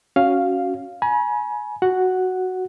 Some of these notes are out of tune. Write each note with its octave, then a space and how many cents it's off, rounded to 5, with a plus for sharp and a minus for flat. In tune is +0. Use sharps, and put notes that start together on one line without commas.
C#4 +0 F#4 +0 F5 +0
G#5 +25 B5 -45
F#4 +0 F#5 +0